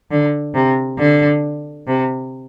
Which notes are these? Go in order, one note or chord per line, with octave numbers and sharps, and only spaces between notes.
D3
C3
D3
C3